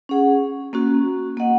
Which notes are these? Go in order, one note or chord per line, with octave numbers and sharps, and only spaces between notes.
C#4 G#4 F#5
A#3 C#4 F#4
A#3 F#4 D#5 F#5